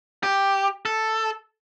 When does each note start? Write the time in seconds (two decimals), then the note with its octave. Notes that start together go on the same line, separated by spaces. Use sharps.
0.23 G4
0.85 A4